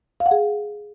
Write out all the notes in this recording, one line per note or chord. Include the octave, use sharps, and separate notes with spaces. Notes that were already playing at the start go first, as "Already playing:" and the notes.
F5
F#5
G#4